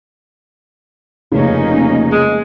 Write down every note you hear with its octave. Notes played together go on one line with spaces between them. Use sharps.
F1 C#3 A#3 C#4 D#4
G#3